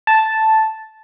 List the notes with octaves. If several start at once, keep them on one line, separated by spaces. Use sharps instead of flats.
A5